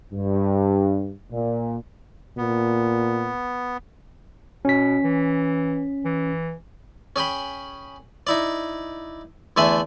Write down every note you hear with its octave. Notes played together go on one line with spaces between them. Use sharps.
G2
A#2
A#2 B3
B2 C#4 B6
E3
E3
C#4 G#4 G5 B5
D#4 E4 D5
E2 D3 A3 E5 G#5 B5